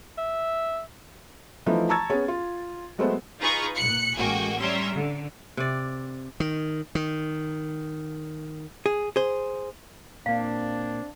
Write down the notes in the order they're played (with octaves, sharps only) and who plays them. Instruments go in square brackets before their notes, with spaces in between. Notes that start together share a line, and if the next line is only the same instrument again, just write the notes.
[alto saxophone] E5
[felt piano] E3 F3 A3 D#4 E4
A5 A#5 C#6 E6 G#6 A6
B3 C#4 G#4 C#5
F4
F#3 G#3 A3 B3 A4 C5
[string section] D#4 F4 G#4 B4 A#5 C#6
A#2 F#6 C#7
A1 G#3 A#3 F#4 G5 G#5
G3 C#4 E5 A#5 C6
D3
[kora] C3 D5
[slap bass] D#3
D#3
[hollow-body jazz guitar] G#4
G#4 C5
[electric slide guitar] A#2 A#3 [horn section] C4 D4 [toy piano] F5